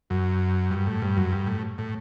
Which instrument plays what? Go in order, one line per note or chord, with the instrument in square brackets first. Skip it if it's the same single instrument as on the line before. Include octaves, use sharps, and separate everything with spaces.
[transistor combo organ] F#2
G2
A2
G2
F#2
G2
A2
A2